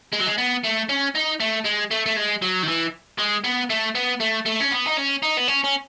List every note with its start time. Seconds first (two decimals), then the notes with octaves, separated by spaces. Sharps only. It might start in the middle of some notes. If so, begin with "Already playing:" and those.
0.13 G#3
0.20 F#3
0.27 G#3
0.38 B3
0.64 A3
0.89 C#4
1.15 D#4
1.40 A3
1.65 G#3
1.91 A3
2.06 A3
2.17 G#3
2.42 F#3
2.63 D#3
2.68 E3
3.19 G#3
3.44 B3
3.70 A3
3.95 B3
4.20 A3
4.46 A3
4.61 C#4
4.72 B3
4.87 D#4
4.97 C#4
5.23 D#4
5.37 B3
5.48 C#4
5.64 C#4